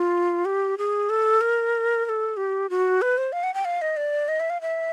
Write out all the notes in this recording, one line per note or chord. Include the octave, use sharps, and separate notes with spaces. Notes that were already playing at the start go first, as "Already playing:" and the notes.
Already playing: F4
G4
G#4
A4
A#4
A#4
A4
G4
F#4
B4
C5
F5
F#5
G5
F5
D#5
D5
D#5
E5
F5
E5